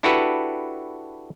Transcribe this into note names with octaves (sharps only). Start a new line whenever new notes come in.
D4 E4 F#4 G4 A4 B4